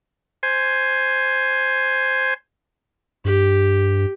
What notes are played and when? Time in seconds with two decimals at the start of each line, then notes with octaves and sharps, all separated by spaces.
0.43 C5 G#5
3.25 G2 G4